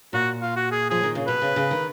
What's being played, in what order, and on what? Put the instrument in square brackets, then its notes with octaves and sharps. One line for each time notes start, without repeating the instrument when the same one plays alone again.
[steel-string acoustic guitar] A#2 [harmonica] F#4
[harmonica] F4
F#4
G#4
[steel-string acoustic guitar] F3 [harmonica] G#4
[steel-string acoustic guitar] D#3
C#3
[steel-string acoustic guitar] B2 [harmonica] B4
[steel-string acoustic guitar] C#3
C#3
D#3